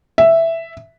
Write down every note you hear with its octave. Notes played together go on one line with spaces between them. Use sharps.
E5